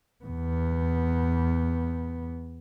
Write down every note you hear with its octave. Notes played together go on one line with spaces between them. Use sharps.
E2 B3